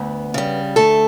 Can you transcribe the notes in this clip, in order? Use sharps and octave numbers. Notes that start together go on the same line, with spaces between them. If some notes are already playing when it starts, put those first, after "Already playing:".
Already playing: D2 B3 B4
C#3 G3
D2 A3 A4